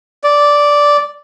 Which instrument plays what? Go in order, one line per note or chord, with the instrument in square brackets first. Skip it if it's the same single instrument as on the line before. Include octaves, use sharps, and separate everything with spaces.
[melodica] D5